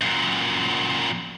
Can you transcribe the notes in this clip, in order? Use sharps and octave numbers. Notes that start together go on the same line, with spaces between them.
F#2 A#2